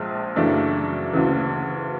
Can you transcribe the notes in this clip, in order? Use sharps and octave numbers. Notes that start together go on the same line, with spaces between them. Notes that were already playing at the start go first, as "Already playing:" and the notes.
Already playing: A#1 A#2 F3 G#3
F#2 C#3 E3 A3 D4
D2 C#3 E3